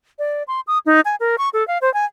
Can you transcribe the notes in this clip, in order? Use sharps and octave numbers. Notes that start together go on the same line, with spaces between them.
D5
C6
D#6
D#4
G#5
A#4
C#6
A4
F5
C5
G#5